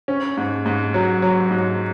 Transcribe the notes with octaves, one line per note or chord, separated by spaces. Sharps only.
C#4
G#2
G#2
F#3
F#3
G#2